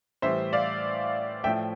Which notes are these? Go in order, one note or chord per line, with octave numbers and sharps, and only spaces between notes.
A2 E3 G3 C5 E5
D5 F5
A2 F3 A3 E5 G5